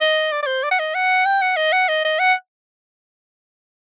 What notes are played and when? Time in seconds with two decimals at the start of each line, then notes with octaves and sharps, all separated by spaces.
0.01 D#5
0.32 D5
0.43 D5
0.47 C5
0.63 D5
0.71 F#5
0.79 D#5
0.94 F#5
1.26 G5
1.41 F#5
1.57 D#5
1.72 F#5
1.88 D#5
2.04 D#5
2.19 F#5